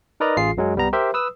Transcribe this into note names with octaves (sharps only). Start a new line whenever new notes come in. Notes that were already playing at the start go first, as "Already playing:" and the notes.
D#4 A#4 B4 D5 D#5 A#5
A1 F4 G#4 C7
F#2 F#3 G#3 C#4
C2 G3 B3 A#5
G4 A#4 C5 E5
B4 D#6 E6